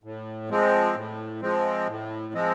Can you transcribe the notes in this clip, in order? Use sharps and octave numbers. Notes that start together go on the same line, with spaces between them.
A2
F3 G#3 C4
A2
F3 G#3 C4
A2
F3 G#3 C4